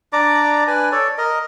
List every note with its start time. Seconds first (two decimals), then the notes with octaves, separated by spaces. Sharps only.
0.13 D4 D5 A#5 D6
0.67 D4 B4 G#5
0.92 A4 C#5 D5
1.18 A#4 D#5